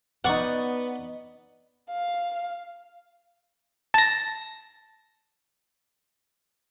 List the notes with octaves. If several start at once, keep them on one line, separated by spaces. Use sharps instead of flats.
B3 D#4 D5 F#5 C#6
F5
A5 A#6